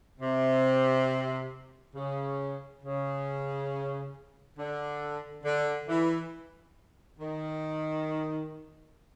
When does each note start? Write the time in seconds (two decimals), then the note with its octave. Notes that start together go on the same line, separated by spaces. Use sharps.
0.20 C3
1.95 C#3
2.83 C#3
4.57 D3
5.44 D3
5.88 E3
7.19 D#3